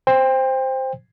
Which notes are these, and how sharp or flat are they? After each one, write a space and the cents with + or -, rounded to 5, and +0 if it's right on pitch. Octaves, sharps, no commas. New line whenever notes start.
C5 +0 G5 +25